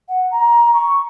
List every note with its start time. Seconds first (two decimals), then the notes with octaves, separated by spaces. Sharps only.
0.08 F#5
0.31 A#5
0.73 C#6